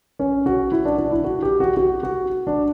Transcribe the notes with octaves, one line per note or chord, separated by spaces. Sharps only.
C#4
F#4
E4
D4
D4
E4
F#4
G4
F#4
F#4
F#4
D4